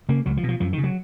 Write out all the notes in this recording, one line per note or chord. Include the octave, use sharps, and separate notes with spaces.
C#3 A#3
C#2 F#3
F3
B2
F3
F#2 F3
D#3
C#3
F#3